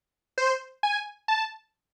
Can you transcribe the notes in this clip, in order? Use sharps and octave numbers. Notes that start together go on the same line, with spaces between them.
C5
G#5
A5